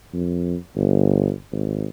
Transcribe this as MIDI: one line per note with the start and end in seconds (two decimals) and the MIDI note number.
0.13 0.56 41
0.75 1.31 31
1.52 1.87 32